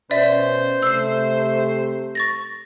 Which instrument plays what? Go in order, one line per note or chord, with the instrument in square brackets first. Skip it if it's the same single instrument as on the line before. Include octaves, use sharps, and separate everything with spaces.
[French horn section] B2 C#4 [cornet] C5 [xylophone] D5 E5
[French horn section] C3 A3 [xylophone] E6 C7
[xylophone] C#6 A6 A#6